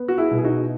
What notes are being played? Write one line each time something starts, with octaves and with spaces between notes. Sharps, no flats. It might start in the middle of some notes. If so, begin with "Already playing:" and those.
Already playing: B3
F#4
E4 G#4
B2
G#4
D#4 F#4